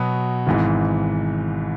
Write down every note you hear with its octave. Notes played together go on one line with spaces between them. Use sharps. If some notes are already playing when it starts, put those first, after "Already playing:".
Already playing: B2 F#3 B3
G#1 G#2 E3